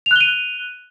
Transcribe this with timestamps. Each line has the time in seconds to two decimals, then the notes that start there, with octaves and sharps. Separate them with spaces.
0.06 F7
0.11 F#6
0.16 G7
0.21 D#7